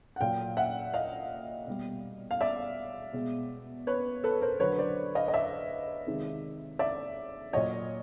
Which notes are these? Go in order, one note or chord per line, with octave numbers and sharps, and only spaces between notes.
F#5
A#2 F#3 F5 G5
E5 F#5
D#5 F5
B2 G3
F5
D5 E5
B2 G#3
B4 C#5
A4 B4
A#4 C5
D3 F#3 B4 C#5
C5 D5
D#5 F5
D#5
D5 E5
C3 D#3 G#3
D5 E5
A#2 F#3 C#5 D#5